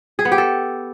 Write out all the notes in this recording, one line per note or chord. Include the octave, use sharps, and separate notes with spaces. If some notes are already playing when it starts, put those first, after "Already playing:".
G#4
B3
G4
A4